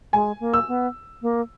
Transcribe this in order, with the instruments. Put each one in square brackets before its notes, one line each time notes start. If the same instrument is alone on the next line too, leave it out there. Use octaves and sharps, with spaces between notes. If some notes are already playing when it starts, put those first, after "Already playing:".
[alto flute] G#3 [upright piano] G#5
[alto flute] A#3
[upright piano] E6
[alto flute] B3
A#3